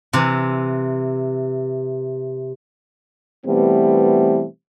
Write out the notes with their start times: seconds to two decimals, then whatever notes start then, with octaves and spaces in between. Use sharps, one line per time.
0.13 C3 E3
3.46 B2 E3 G3 A3 B3 C4